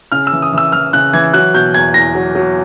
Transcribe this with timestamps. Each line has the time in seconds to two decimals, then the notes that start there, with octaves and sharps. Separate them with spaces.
0.12 C#3 F6
0.27 E6
0.32 E3
0.42 D#6
0.53 E3
0.58 E6
0.72 E3 F6
0.93 C#3 F#6
1.13 E3 G#6
1.34 F#3 F#6
1.54 B2 G6
1.74 E2 G#6
1.94 E2 A#6
2.15 F#3
2.35 F#3